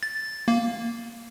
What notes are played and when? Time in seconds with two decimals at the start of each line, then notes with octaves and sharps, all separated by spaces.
0.03 A6
0.48 A#3